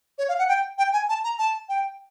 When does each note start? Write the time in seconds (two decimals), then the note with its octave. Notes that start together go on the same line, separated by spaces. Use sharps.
0.18 C#5
0.28 F5
0.39 F#5
0.48 G5
0.78 G5
0.93 G#5
1.09 A5
1.24 A#5
1.39 A5
1.69 G5